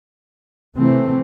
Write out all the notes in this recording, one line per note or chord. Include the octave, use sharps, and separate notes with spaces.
C3 E3 A3 C4